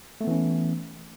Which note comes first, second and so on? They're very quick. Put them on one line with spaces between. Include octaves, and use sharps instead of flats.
A3 B3 E3 C#4